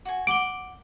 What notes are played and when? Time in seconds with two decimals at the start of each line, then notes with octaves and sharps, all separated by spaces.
0.05 F#4 G#5
0.27 F#5 D6 D7 G7